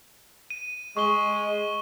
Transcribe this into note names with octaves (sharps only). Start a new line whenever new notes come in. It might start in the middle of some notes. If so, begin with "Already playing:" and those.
D#7
G#3 C#6 G7